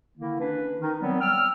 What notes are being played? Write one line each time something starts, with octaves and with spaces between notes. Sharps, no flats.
D3 D#3 A#3 E4
C#4 D4 B4
D#3 D#4
F#3 G3 B3 C4
G5 E6 F6